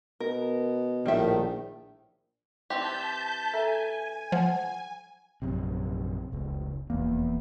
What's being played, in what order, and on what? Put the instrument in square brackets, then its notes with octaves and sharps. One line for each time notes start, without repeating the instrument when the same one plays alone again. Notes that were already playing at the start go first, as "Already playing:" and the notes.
[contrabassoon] B2 [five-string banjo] A#4
[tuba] A#1 [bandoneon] A2 D#3 [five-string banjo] G3 E5
[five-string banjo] E3 C4 G4 [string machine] A5 G6 B6
[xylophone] A4 E5 A#5 [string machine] G#5
[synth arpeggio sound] F3 [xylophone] F#5 A5
[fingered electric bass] A#1 F#2 C3
F1 C#2
[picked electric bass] F1 A#3 [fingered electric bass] E2